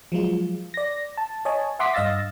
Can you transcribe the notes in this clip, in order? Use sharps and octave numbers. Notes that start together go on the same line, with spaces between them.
F3 F#3 G#3 F4
D5 A#6
A5
C#5 D#5 G#5 A5
E5 F#5 C6 D6 D#6 B6
G2 D#5 F5 E6 A6 A#6